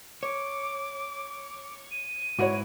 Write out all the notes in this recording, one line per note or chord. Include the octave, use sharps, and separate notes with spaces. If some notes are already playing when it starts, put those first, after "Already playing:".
C#5 D6
D#7
G#2 E4 F#4 B4 C#5